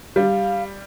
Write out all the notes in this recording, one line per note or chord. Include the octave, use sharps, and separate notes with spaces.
G3 F5